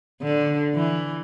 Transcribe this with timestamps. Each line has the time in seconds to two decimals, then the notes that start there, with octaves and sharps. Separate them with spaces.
0.22 D3
0.75 E3